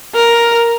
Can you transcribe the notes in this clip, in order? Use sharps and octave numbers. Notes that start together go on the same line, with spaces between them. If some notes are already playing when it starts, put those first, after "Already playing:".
A#4